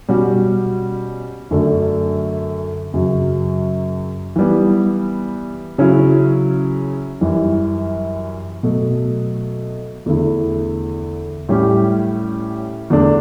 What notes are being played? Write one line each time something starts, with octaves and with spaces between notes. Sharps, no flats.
B2 G3 C#4 F#4
F#2 D3 A3 D4 F#4
F#2 C#3 F#3
E3 G3 B3
C#3 F#3 C#4 E4
F#2 E3 G3
B2 F#3 A3
E2 D3 A3 E4
A2 G3 C#4 G4
E2 D3 A3 D4